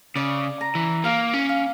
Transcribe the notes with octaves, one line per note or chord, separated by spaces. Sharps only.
C#3 D5
A#5
E3
A#3 F5
C#4
F5